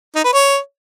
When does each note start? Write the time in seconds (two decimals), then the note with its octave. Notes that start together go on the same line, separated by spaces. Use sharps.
0.15 D#4
0.24 B4
0.33 C#5